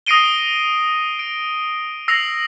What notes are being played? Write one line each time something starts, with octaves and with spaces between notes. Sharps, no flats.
D#6 A#6 C7 D7 D#7 G7
D7
E6 A#6 C7 F7